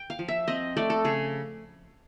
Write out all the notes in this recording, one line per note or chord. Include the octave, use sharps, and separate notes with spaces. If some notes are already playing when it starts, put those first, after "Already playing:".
Already playing: G5
F5
F3
E5
C4 D#5
A3 D5
A4
C#3 G#4